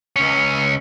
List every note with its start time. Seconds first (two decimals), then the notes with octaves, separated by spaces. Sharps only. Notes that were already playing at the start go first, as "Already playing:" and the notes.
0.16 C#2 C#4